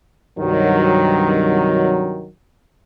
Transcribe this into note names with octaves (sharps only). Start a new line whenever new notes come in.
C2 G2 D#3 F#3